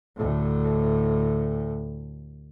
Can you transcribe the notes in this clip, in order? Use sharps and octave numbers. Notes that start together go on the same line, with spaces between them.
D2 A2